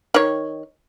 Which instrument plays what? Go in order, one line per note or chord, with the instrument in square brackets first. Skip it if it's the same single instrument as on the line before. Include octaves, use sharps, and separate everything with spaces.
[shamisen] D#3 C#5